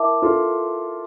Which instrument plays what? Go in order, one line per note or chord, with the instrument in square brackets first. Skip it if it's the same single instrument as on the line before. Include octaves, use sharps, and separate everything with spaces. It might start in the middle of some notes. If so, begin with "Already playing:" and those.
Already playing: [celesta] E4 A#4 E5 A5 D6
[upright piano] F4 A4